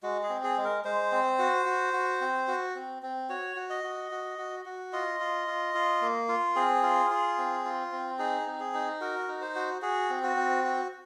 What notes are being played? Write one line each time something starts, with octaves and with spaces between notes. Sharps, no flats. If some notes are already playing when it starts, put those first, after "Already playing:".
G#3 F#4
G#4
C4
G#4
G#3
A#4
G#3 C5
C4
F#4
F#4
F#4
C4
F#4
C4
C4
F#4 C#5
F#4
D#5
F#4
F#4
F#4
F#4
F4 D#5
F4
F4
F4
A#3
F4
C4 G#4
F4
F4
C4
F4
C4
D#4 G#4
C4
G#4
D#4
F#4 A#4
D#4
C5
F#4
F#4 G#4
C4
F#4
C4
F#4